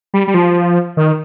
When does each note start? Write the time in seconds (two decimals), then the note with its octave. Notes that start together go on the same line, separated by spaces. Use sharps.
0.14 G3
0.28 G3
0.34 F3
0.97 D#3